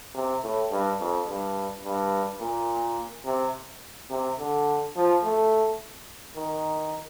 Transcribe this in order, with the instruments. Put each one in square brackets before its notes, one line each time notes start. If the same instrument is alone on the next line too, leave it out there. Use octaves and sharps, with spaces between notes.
[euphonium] C3
A2
G2
F2
G2
G2
A#2
C3
C3
D3
F3
A3
D#3